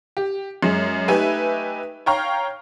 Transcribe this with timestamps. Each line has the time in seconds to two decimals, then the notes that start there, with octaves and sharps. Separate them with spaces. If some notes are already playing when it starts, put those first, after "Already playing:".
0.17 G4
0.63 F#2 G#3
1.08 A3 D#4 G4 B4 E5 G#5
2.06 C#5 F5 G5 A#5 C#6 F6